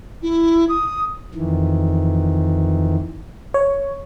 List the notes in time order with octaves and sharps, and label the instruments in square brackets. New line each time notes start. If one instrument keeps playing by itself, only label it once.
[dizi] E4
D#6
[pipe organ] F2 D#3 E3
[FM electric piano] C#5